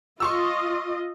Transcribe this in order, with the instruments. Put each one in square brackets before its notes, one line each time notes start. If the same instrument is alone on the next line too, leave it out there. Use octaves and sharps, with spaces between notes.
[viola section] F4 D#5 [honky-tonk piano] C6 C#6 E6